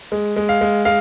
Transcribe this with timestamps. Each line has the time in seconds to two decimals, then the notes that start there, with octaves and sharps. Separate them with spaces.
0.12 G#3
0.37 G#3
0.49 F5
0.61 G#3
0.85 G#3 F5